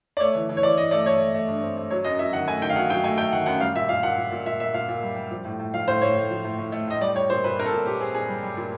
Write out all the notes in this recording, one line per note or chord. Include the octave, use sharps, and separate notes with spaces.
D5
A3 C#5
E3
E3
C#5
E3 D5
E3 D#5
A3 D5
A3 C#5
A3
A3
G2
C4
A3
F#3 C#5
F#2 D#5
F#3 E5
D#3 F#5
A3 G#5
D#3 G5
F5
F#3 F#5
F#3 G5
A3 G#5
A3 G5
D#3 F#5
F#2 F#5
G3 F5
A#2 E5
A#2 F5
A#2 F#5
A#2
A#2
A#2 E5
A#2 E5
A#2 F5
A#2
G3
G3
F3
A2
A2
F3 F5
A2 C5
A2 C#5
A2
F3
A2
A2
A3
A2 D#5
G3 D5
G3 C#5
A#2 C5
A#2 B4
C4 A#4
A4
A#2
A#2 G4
C4 G#4
A#2 G#4
G3
G3
A#2